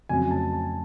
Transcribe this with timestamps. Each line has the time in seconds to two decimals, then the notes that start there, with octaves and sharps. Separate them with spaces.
0.09 F2 C#3 F#3 A3 G#5
0.31 A5
0.53 A5